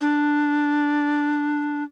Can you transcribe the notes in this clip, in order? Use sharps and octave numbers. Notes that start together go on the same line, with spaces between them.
D4